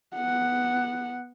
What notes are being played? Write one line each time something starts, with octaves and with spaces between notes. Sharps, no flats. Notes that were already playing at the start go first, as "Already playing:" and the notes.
B3 F#5